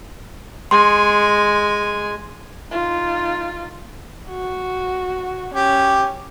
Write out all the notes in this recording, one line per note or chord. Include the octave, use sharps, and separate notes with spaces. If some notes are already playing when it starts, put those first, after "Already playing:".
G#3 G#5 C6
D#4 F4
F#4
C#4 G4